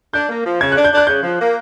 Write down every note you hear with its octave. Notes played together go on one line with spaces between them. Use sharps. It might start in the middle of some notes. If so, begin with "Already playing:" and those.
D4 G6
A#3
F3
C#3 G#6
D4 F#6
G6
D4
F#6
C#3 G6
F3
A#3